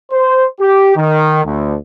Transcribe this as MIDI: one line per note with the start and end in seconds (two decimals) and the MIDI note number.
0.12 0.46 72
0.60 0.94 67
0.96 1.44 51
1.45 1.76 38